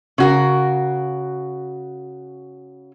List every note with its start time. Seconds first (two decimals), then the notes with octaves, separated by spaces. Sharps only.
0.18 C#3 F#4 A#4